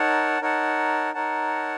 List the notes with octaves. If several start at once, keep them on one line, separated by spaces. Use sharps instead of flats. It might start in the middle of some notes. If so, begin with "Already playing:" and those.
Already playing: D#4 A#4 C#5 F#5 A5
D#4 A#4 C#5 F#5 A5
D#4 A#4 C#5 F#5 A5